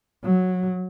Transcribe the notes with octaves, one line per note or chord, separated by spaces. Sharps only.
F#3